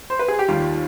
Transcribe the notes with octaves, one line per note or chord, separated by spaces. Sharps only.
C5
B4
G#4
G4
D#2 D#3 G3 F4